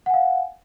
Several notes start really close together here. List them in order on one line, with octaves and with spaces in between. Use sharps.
F#5 G#5 F5